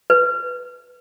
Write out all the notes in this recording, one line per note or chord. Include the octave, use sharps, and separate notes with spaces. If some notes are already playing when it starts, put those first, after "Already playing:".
B4